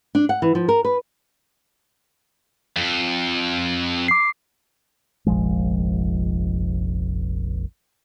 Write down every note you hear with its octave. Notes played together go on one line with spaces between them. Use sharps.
D4
F#5
E3
F3
A#4
B4
F2
D6 C7
F1 A#1 F3 G#3